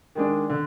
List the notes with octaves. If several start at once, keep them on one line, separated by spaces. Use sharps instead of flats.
D#3 G#3 D4
D3